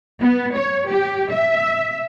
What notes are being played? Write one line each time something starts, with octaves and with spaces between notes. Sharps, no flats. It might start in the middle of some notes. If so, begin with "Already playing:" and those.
B3
C#5
G4
E5